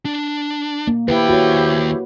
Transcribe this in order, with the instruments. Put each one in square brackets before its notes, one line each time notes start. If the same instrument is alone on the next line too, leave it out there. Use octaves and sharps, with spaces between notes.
[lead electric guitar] D4
[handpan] A#3
[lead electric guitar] D#2 G5 [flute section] E4 G4 C5 [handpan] B4
[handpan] F#4 C#5